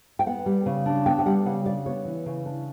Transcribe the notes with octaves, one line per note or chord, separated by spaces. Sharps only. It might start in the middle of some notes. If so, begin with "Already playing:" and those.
G5
B3 F#5
G3
C#3
D4
B3 G5
G5
G3 F#5
C#3 F#5
D4 D5
B3 C#5
E3
C#3
D4